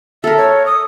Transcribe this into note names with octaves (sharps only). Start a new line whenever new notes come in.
A4 A#4 E5
C#5
D#6